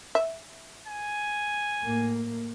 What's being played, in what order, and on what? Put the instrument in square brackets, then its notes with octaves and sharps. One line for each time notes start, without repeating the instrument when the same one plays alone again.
[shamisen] E5
[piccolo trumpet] G#5
[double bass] A2 A#3